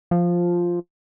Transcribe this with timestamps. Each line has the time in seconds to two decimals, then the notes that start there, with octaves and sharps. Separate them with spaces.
0.11 F3